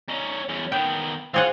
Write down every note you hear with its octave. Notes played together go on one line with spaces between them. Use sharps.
C#4 D#4
E2 C#4
D#3 B3 G5
C4 F4 G#4 F5 F#5